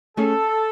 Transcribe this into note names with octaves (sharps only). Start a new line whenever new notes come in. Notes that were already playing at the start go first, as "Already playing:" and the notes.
A3 C#4 G#4 A4 C#5